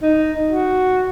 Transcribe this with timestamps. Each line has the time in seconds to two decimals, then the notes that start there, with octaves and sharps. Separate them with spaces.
0.03 D#4
0.47 F#4